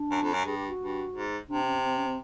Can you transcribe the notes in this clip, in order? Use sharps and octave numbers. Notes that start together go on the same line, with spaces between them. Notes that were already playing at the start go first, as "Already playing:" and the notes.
Already playing: D4
F#2
F2
F#2
G2 G#4
G4
F#4
G2
G#2
C3 D4
C#4
C4
C#4
C4